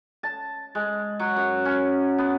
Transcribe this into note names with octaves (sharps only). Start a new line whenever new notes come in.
A5
G#3
F#3
F#2
C#4
B3